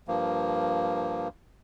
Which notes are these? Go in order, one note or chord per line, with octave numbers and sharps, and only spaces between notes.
G2 F3 A#3